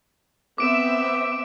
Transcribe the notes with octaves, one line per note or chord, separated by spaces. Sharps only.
B3 C4 E5 D6 D7 E7